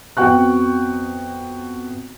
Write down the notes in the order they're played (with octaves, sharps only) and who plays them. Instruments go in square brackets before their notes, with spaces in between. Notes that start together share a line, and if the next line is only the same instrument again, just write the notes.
[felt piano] F2 B3 F#4 G5 C#6 F#6